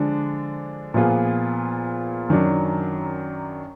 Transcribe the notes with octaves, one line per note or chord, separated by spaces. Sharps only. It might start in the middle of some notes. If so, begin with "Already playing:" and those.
Already playing: D3 F3 G#3 D4
A#2 F3 B3 F4 G#4
F#2 D#3 F#3 D4